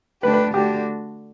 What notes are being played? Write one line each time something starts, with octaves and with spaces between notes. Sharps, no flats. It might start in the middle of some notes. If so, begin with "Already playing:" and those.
D3 A3 D4 G4 B4
B4
D3 A3 D4 F#4 G4